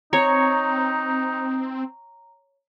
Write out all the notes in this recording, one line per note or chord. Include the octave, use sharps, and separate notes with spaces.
C4 D#4 C#5 A#5